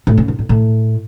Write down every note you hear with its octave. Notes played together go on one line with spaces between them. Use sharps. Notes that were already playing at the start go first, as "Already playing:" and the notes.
A2
C#3
G#2
A2
A2